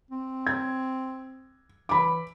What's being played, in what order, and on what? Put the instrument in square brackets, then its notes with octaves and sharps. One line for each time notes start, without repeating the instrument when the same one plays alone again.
[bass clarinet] C4
[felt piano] G#6
[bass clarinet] E3 [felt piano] B5 D6